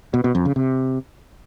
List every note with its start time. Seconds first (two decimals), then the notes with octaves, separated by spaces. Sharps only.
0.14 B2
0.24 B2
0.35 F2
0.45 C#3
0.56 C3